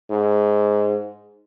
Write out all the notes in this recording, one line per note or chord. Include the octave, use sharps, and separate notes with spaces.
G#2